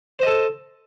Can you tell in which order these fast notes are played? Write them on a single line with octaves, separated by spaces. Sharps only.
C5 D#5 A4